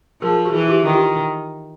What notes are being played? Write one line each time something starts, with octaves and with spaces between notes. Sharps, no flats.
F3 G#4 A#4
F#4 G#4
E3
F4 G4
D#3
F4 G4